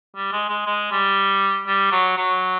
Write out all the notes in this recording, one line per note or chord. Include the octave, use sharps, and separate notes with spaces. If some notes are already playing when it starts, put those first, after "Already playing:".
G3
G#3
G#3
G#3
G3
G3
F#3
F#3